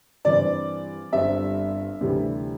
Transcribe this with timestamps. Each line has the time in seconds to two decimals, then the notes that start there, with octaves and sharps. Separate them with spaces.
0.25 G2 E3 C4 D5
1.12 G1 G2 G3 C4 E5
2.01 D2 C3 E3 G3